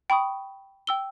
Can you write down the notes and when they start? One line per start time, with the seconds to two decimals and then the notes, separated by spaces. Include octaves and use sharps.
0.10 G5 B5 C#6 D#6
0.87 G5 E6 G7